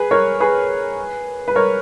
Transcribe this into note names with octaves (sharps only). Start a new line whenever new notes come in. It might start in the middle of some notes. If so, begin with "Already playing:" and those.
Already playing: G#4 B4
A#4 C#5
G#4 B4
B4
A#4 C#5